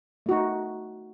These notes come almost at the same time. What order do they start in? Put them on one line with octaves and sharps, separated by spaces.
A3 F#4 D#4